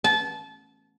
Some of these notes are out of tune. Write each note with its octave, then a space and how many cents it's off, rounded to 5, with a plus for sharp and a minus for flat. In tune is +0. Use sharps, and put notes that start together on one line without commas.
A5 -25